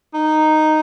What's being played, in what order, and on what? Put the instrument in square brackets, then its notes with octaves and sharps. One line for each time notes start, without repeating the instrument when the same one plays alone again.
[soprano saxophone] D#4